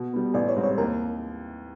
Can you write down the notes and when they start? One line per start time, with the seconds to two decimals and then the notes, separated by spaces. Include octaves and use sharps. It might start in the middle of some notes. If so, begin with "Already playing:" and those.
Already playing: B2
0.13 G3 B3
0.34 A1 D5
0.49 C#5
0.56 G#2 E3 G3 C4
0.64 C#5
0.78 D#2 A#4